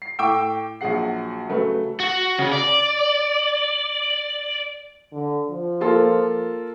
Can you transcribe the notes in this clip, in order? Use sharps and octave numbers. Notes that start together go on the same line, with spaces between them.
C7
A2 G5 C#6 D6 E6 D7
A#1 F#3 F#4 G#4 F#5 C7
C#3 F#3 A3 B4
F#4
C#3
D5
D3
F3
A#3 F4 A4